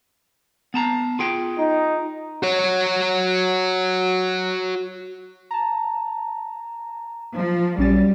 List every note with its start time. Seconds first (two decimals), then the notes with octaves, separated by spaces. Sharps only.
0.74 B3 A5 A#5
1.19 F4 G#4 G5
1.59 D#4
2.43 F#4 C#5
5.51 A5 A#5
7.34 F3
7.78 A#1 F#3 G3 C#4 A6